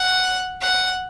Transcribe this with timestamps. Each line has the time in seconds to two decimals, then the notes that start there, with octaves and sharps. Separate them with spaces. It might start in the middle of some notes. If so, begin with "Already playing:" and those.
Already playing: F#5
0.61 F#5